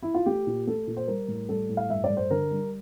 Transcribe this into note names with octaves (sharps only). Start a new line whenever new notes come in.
E4
F4
A3 G4
A#2
A3 A4
A#2
C5
G3 A#4
A2
G3 A4
A2
F5
G2 E5
D5
G2
C5
D3 A#4
G3